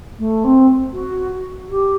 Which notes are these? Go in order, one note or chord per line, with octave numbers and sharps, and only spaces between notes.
A3
C4
F#4
G4